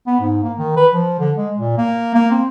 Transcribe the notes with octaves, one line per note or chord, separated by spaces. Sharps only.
B3
G#2
A#3
D#3
B4
F3
D3
G#3
A#2
A#3
A#3
C4